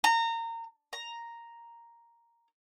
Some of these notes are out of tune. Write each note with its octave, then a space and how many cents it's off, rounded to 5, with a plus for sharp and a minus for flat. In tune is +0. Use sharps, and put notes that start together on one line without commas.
A#5 -25
A#5 +0